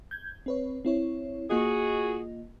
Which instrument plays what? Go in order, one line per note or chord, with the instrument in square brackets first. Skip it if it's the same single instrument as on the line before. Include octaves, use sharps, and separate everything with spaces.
[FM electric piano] G6 G#6
C4 B4 C#5
C4 E4 C#5
[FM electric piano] A#3 F4 D#5 [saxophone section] F#4 G#4